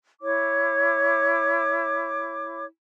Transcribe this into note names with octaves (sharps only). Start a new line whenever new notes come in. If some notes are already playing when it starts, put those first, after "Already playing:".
E4 C#5 D6